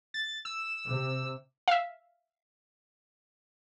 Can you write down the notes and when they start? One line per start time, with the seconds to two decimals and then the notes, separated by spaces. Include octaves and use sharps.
0.14 A6
0.45 E6
0.88 C3
1.68 E5 F5